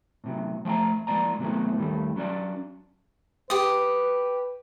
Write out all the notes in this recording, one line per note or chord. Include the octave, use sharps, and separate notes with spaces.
A2 C3 F#3
F3 A3 G5 A#5
F3 G#3 A#3 D5 A#5
G#2 C3 F#3 G3 A3 B3
D#2 G3 A3
F#3 C#4 D4 D5
G4 B4 D#6